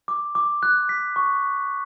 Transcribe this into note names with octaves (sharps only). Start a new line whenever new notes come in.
D6
D6
F#6
B6
C#6